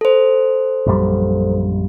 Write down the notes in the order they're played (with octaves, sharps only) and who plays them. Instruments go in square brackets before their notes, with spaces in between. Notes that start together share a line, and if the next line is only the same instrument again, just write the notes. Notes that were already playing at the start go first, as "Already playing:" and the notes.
[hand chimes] A4 C5
[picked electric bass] A#1 F#2 G3